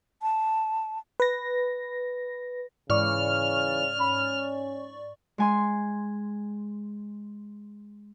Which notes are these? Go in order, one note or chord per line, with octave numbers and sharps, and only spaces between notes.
A5
B4 A#6
G#2 C#3 E3 D5 C#6 F6
C#4 B5
G#3 G#5 C6